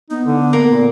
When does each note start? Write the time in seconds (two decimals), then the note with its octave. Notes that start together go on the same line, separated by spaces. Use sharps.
0.10 B3 D#4
0.26 D3
0.53 A#3
0.70 A#2